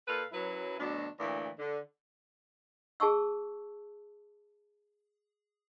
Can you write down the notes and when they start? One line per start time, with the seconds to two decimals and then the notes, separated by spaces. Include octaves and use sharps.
0.08 A#2 A4 B4 F5
0.32 F#2 F#3 E4 B4
0.80 D2 B2 F#3 D4
1.19 D2 A#2 E3
1.59 D3
3.00 G#4 A5 C#6 E6